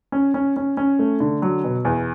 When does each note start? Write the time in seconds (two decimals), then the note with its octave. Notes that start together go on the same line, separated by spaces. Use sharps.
0.12 C#4
0.34 C#4
0.56 C#4
0.77 C#4
0.99 A3
1.20 D3
1.42 F#3
1.64 B2
1.85 E2